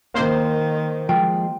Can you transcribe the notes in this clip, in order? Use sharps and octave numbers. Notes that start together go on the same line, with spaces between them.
D#3 A#3 C5
F3 G#3 G5